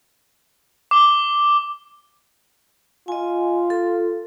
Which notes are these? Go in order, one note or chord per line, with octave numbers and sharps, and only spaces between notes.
D6 G7
F4 D#5 G#5
A4